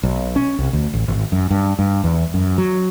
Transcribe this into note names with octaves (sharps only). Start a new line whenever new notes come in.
B1
C#4
C2
D2
A1
G#1
F#2
G2
G2
E2
F#2
F#3